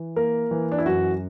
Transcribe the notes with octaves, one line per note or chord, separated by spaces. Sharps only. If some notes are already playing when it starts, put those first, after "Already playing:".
Already playing: E3
A#3 A#4
E3
D4
E4
F#2 F#4